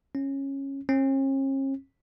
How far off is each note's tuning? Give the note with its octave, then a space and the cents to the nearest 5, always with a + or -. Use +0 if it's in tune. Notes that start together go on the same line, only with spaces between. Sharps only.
C#4 -15
C#4 -45